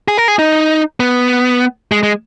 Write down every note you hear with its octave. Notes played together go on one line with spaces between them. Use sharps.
G#4
A#4
G#4
D#4
B3
G#3
G#3